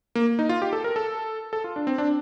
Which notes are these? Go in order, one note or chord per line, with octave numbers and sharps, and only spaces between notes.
A#3
D#4
F4
G4
A4
A#4
A4
A4
F4
D4
C4
D4